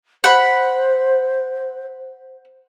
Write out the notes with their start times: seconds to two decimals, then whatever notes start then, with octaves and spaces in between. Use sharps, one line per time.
0.24 C5 F#5 B5